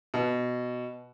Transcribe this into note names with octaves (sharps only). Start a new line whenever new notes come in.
B2